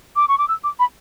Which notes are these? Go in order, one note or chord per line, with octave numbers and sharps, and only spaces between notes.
D6
C#6
D6
E6
D6
B5